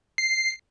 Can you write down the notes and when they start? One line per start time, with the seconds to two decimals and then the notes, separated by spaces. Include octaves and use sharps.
0.18 C7